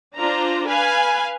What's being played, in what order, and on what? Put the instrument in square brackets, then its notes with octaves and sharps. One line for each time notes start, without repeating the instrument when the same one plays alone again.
[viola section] D4 F4 C5 A#5
B4 F5 G#5